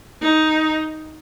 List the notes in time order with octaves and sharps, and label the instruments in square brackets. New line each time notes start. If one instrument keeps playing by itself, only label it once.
[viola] D#4